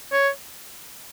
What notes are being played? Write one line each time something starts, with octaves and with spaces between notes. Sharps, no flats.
C#5